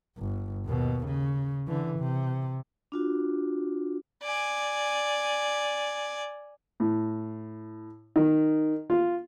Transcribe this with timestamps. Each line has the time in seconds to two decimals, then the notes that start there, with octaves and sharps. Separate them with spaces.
0.18 G1
0.66 D#2 B2
1.06 C#3
1.67 D3 E3
1.98 C3
2.92 D4 F4 F#4
4.23 D5 G#5
6.80 A2
8.16 D#3
8.90 F4